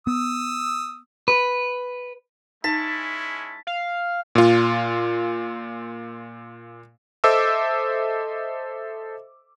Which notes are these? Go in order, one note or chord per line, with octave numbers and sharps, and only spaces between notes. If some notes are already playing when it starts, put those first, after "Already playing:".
B3 D#6 E6
B4
G#3 C#4 D#4 E4 A5 B6
F5
A#2 F4
A4 C5 D#5 E5 D6 E6